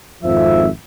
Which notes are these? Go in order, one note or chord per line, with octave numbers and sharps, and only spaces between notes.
G#1 F2 F3 E5